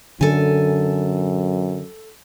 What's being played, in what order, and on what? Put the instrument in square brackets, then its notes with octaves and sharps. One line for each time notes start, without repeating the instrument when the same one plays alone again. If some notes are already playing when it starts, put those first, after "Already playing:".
[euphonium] F#2 [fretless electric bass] D3 [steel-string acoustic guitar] A4 G#5